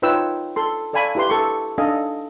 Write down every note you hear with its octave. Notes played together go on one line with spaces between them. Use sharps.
D#4 F4 B4 C#5 G5 E6
A4 C6
A4 D5 F5 G#5 B5 C#6
E4 G4 B4 C6
A4 C#6
D4 D#4 A4 D#5 F5 G#5